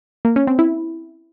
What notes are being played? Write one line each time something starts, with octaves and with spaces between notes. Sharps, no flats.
A#3
C#4
C4
E4